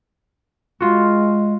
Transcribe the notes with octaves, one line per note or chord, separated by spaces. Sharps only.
G#3 F4 F#4